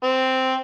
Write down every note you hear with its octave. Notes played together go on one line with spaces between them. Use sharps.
C4